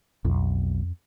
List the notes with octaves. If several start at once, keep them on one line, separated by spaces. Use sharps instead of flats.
B1 F2